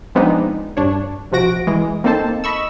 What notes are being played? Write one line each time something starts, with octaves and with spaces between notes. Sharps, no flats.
F3 G#3 B3 C4 D4 D#4
G2 D4 C#5
A#1 C3 F3 F#4 A#6 D7
E3 G#3
A#3 C4 D#4 A4 C5 A5
D#5 B5 C#6 E6